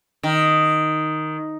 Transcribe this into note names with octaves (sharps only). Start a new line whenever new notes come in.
D#3